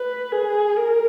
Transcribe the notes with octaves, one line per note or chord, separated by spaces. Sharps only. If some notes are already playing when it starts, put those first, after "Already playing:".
Already playing: B4
G#4
A#4